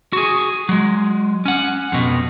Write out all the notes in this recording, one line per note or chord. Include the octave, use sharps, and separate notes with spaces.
F#4 G#4
F#3 G#3
C#4 F#5
F2 B2